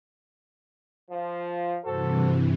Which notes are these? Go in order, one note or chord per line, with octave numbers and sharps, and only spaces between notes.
F3
G2 C3 E3 F#4 A4 C5